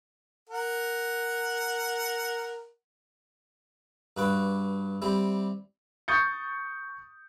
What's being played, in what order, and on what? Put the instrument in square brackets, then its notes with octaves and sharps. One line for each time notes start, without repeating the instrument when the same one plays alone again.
[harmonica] A#4 F#5
[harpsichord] G2 F#4 B4 D6
G3 C4 E4 G4
[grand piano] C#6 D#6 G6 A6 C#7